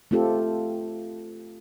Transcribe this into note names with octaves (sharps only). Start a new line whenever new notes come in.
A3 C4 F4 G4 A4